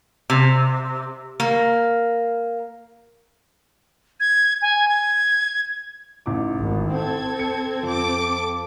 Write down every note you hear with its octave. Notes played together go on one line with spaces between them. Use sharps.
C3
A#3
G#6
G#5
G#6
A1 D#4 D6
G#1
C4 A4 G#6
C#7
F2 A4 D6